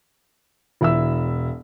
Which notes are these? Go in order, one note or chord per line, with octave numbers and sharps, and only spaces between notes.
E1 E4 E6